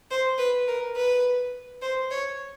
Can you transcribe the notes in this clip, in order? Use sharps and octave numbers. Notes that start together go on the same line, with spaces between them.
C5
B4
A#4
B4
C5
C#5